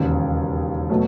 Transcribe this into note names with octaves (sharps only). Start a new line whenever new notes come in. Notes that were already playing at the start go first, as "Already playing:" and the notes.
Already playing: E1 D#2 C#3
B2 F#3 A3